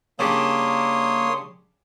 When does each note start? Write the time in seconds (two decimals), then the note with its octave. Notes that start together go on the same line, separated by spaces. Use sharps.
0.19 C#3 G3 A#3 D4 C#5 C6 D#6